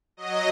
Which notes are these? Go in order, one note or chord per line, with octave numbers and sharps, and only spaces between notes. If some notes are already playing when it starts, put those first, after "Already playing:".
F#3 D#5